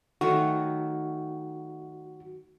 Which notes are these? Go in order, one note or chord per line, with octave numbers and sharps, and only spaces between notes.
D#3 F#3 A3 F#4